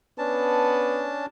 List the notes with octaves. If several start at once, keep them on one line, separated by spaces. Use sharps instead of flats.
B3 C#4 D4 A5